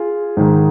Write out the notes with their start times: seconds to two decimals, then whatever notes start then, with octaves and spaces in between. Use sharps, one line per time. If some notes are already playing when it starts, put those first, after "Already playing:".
Already playing: F4 G#4
0.37 G#2 D#3